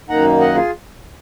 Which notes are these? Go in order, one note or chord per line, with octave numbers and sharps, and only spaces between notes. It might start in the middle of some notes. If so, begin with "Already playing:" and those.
F#2 D#3 A#3 D#4 F#5 A#5
D#5 F#5
F4 G#4